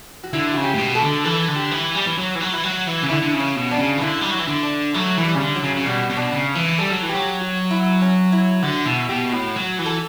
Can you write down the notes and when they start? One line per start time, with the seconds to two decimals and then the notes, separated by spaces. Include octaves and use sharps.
0.24 F#4
0.33 D3 E4
0.53 C#3 F#4
0.64 G4
0.75 A2
0.79 B2
0.95 A4
1.02 D3
1.25 E3 A4
1.48 D3
1.56 G4
1.71 E3
1.95 G3
2.07 E3
2.18 F#3
2.35 E3
2.41 F#3
2.53 E3
2.63 F#3
2.87 E3
3.03 C#3
3.10 D3 E4
3.22 D3
3.33 C#3
3.40 C#4
3.56 B2
3.71 D4
3.79 C#3
3.98 E3
4.02 D3 E4
4.21 G3
4.31 F#3 E4
4.40 E3
4.48 D3
4.63 D4
4.94 F#3 A3
5.17 E3
5.25 G3
5.35 C#3
5.40 D3
5.56 F#3
5.63 C#3
5.76 C#3
5.86 B2 G3
6.09 B2
6.17 D4
6.32 C#3
6.55 E3
6.78 G3 A4
6.90 F#3
7.03 E3
7.09 F#3 G4
7.40 F#4
7.71 E4
8.02 C#4
8.32 E4
8.63 D3 F#4
8.86 B2 E4
9.09 B2 G4
9.32 A2 F#4
9.55 F#3 F#4
9.78 E3
9.86 A4